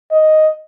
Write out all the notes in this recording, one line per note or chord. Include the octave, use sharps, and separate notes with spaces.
D#5